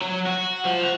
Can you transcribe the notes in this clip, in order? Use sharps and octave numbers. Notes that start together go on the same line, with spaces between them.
F#3
F#4
F3
F#4